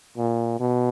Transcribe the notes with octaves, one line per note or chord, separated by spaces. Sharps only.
A#2
B2